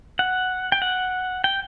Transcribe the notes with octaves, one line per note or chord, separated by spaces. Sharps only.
F#5
G5
F#5
G5